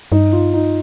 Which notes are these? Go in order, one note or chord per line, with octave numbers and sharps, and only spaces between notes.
G2 D#4
F4
D#4